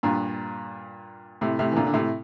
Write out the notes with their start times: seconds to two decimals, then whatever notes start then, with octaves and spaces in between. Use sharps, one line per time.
0.03 G2 A#2
1.41 A2 C3
1.59 A2 C3
1.72 E3
1.76 A#2 D3
1.86 D3
1.94 A2 C3